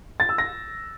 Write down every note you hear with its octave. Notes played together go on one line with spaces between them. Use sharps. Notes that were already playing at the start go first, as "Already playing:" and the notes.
A6
E6
A#6